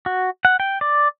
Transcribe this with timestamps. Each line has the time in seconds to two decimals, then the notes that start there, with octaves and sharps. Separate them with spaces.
0.06 F#4
0.45 F#5
0.60 G5
0.81 D5